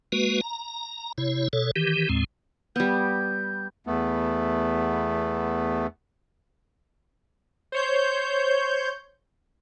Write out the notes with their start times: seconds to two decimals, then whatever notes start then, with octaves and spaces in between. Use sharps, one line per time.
0.12 G#3 A#3 F#4 B4
0.41 A#5
1.18 C3 E4 C#5
1.53 B2 A4 C#5
1.76 D#3 E3 G4
2.09 D#2 A2 G#3 C4
2.76 G3 B3 G6
3.87 E2 A3 B3
7.72 C5 C#5 G6